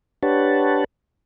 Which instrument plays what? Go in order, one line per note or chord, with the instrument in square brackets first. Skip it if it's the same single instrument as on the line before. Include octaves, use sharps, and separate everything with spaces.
[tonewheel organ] D4 G4 B4 C#5 F#5 A5